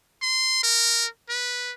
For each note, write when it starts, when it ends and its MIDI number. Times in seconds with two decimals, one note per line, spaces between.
0.22 0.62 84
0.63 1.07 70
1.29 1.72 71